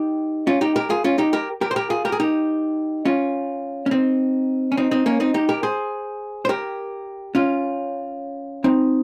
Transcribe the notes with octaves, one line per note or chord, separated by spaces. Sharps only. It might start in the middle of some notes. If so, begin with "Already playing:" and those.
Already playing: D#4 G4
C#4 F4
D#4 G4
G4 A#4
F4 G#4
C#4 F4
D#4 G4
G4 A#4
G4 A#4
C5
G4 A#4
F4 G#4
G4 A#4
G#4
D#4 G4
C#4 F4
C#4
C4 D#4
C#4
C4 D#4
C4 D#4
A#3 C#4
C4 D#4
D#4 G4
G4 A#4
G#4 C5
C5
G4 A#4
C#4 F4
C4 D#4